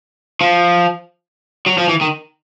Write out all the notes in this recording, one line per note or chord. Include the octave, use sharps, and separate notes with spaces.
F3
F#3
F3
E3
D#3